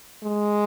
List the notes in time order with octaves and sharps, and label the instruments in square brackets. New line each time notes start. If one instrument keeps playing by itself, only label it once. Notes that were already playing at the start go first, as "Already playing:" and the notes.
[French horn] G#3